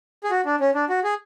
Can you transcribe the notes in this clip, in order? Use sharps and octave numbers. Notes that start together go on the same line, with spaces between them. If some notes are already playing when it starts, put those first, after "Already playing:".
G#4
F#4
D4
C#4
D4
F#4
G#4